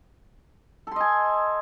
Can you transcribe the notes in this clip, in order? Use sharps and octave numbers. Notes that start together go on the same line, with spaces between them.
A4 D#5 G#5 C6